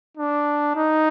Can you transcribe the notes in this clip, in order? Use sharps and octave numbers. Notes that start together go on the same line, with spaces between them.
D4
D#4